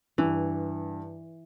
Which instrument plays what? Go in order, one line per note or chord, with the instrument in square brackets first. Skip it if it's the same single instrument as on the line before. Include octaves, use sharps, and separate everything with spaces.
[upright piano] G2 [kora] E3